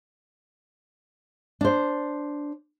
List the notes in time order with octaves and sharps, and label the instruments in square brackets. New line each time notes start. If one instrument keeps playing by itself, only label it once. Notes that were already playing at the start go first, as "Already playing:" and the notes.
[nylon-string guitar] D4 C5